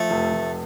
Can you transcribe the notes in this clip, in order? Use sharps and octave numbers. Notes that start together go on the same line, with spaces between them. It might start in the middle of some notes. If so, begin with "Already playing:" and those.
Already playing: F3 A3
F1
F1